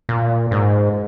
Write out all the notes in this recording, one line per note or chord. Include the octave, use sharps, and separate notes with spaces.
A#2
G#2